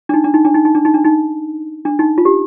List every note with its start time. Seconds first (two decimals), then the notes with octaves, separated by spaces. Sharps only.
0.09 D4
0.14 D#4
0.24 D4
0.34 D#4
0.45 D4
0.54 D#4
0.65 D#4
0.75 D4
0.85 D#4
0.94 D4
1.04 D#4
1.85 D4
1.99 D#4
2.18 F4
2.25 G4